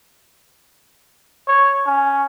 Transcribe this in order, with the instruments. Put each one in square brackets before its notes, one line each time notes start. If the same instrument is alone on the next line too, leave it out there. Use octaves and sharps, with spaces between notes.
[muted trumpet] C#5
C#4